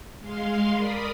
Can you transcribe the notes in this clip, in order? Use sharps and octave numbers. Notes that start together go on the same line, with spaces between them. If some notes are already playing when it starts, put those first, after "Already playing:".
G#3 F5 C6
A#4 D5 B5 D#6